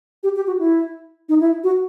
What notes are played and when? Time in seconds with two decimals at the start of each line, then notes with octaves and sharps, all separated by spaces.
0.23 G4
0.36 G4
0.47 F#4
0.59 E4
1.29 D#4
1.40 E4
1.64 F#4